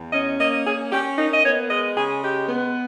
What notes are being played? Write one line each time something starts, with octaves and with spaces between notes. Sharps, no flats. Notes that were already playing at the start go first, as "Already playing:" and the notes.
Already playing: E2
C#4 D#5
A#3 D#5
C#4 G#4
C#4 G4
A#3 D#4
D#5
B3 C#5
G#3 D#5
C#3 G#4
G#3 G4
B3